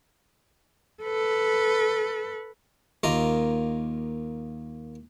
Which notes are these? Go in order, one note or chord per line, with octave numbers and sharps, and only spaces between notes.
A4 B4
D#2 A#3 F4 D#5 A#5